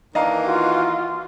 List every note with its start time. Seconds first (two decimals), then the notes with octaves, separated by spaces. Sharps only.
0.15 D#3 E3 A#3 D4 D#5 F5 A#5
0.46 F4 F#4